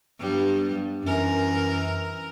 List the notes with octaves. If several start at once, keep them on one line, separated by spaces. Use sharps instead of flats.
G2 G3 B3
F#2 E3 A#4